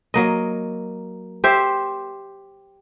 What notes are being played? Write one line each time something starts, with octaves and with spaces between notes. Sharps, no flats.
F#3 A#3 D#5
G4 C5 E5